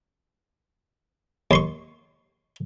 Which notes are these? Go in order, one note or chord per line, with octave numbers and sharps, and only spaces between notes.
D#2 C6 C#6